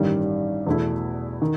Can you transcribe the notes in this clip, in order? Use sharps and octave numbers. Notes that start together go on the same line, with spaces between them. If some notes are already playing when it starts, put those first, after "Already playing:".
Already playing: A1 G2 D#3 G3
E2 B2 A3 E4
D#3